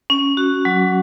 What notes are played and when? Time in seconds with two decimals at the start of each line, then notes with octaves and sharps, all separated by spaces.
0.10 C#4
0.37 F#4
0.65 F#3